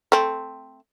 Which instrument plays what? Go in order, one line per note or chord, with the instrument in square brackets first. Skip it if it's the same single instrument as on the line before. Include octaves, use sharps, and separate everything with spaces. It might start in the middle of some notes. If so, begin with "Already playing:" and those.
[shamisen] A3 C4